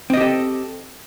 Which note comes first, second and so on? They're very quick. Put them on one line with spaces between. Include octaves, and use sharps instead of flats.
C4 D#5 G4 A4